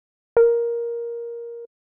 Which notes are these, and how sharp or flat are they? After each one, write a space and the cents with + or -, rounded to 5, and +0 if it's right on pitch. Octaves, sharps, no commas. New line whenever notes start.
A#4 +10